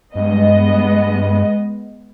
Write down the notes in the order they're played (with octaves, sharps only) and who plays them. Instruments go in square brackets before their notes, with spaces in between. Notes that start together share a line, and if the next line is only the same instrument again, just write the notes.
[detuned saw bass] G2 [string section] G#3 B3 D#5